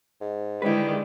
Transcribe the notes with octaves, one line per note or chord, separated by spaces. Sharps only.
G#2
D3 D#3 G3 G#3 E4 B4